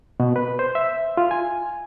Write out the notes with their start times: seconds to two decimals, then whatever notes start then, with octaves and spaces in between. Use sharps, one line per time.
0.20 B2
0.36 B4
0.59 C5
0.75 E5
1.17 F4
1.31 G#5